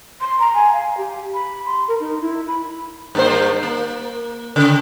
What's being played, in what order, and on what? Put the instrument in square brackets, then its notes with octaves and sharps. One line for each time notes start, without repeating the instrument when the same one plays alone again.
[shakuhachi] C6
A#5
G#5
F5
G4
B5
C6
A#4
D#4
E4
B5
[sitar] G2 A#3 C5
A#3
C#3